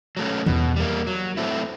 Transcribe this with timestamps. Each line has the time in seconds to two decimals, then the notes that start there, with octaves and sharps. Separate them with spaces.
0.17 F#3 A3 C#4
0.46 E2 B2
0.76 G3 A#3
1.07 F#3
1.37 A3 C4 E4